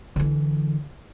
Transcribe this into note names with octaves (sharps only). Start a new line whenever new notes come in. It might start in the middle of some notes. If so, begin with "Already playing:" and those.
D3 E3